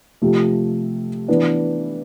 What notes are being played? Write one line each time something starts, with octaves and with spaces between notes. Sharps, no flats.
C3 F3 A3
E3 B3 D4